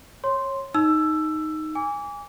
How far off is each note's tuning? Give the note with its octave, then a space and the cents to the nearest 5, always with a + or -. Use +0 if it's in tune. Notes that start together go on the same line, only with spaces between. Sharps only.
C#5 -20 C6 +0
D#4 +0 E6 +15
G#5 -20 D6 -30